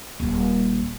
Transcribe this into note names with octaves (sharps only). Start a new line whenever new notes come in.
D#1 G3